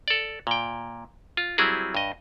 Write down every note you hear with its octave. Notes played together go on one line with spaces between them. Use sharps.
A4 D5
A#2 G5
F4
F#3 G3 C4 E4 G#4
G2 D#5